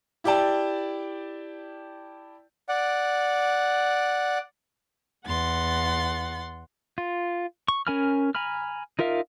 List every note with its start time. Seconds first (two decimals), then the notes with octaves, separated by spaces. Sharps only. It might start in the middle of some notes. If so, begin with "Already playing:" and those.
0.24 E4 G4 D5 G5 A5
2.69 D5 F#5
5.27 E2 F#5 C6 A6
6.98 F4
7.68 C#6
7.87 C#4 A#4 G#5 B5 F6
8.35 G#5 A#5 B5 F6
8.99 D#4 F4 A#4 E5 F5